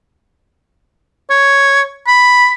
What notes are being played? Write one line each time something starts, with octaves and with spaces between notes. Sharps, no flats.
C#5
B5